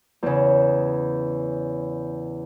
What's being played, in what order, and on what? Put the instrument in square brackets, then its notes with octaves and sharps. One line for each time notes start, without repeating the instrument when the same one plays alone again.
[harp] E2 C#3